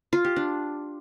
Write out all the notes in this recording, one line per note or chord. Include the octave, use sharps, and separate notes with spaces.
F4
G4
D4